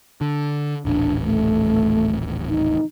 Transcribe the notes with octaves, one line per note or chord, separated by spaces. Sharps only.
D3
D#1 A1 D4
A3
D#4